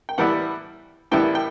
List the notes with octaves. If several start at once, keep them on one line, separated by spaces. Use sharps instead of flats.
G5
A2 E3 G3 B3 E4 F#5
A2 E3 G3 B3 E4 G5
G5